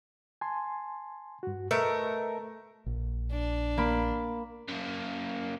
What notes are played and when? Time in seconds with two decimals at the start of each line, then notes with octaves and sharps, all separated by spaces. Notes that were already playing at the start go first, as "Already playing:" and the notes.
0.41 G#5 A5 C6
1.43 G2 F#4
1.71 A3 A#4 B4 D#5 E5 A#5
2.86 A#1
3.32 D4
3.77 A#3 B5
4.69 F#2 A#3